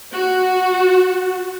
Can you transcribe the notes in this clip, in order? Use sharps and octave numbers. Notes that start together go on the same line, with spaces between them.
F#4